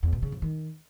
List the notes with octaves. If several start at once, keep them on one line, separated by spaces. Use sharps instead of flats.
E2
B2
C#3
F2
D#3